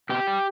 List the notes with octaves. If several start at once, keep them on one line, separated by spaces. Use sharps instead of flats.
B2 G4
G3